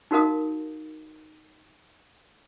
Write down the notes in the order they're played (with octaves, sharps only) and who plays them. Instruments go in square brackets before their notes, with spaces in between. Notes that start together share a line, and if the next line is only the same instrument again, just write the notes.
[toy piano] D#4 F#4 A#4 F5 D#6